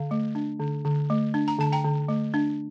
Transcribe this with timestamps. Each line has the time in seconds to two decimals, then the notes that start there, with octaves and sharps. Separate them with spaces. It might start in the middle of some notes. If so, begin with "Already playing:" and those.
Already playing: D3 F5
0.11 A3
0.35 D4
0.60 D3
0.85 D3
1.10 A3
1.34 D4
1.48 A#5
1.59 D3 A5
1.72 G5 A#5
1.85 D3
2.08 A3
2.34 D4